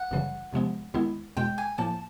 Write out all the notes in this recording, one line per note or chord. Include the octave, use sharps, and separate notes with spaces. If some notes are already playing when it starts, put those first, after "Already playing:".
Already playing: F#5
G1 F#2 C#3 E3 G3
E2 C3 F3 G#3 B3
D#2 D#3 G#3 B3 E4
E2 B2 G#3 G5
G#5
A2 F3 A#3 A5